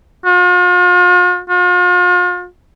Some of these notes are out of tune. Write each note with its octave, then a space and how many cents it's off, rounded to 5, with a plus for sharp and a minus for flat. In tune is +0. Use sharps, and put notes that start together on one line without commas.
F4 +45
F4 +40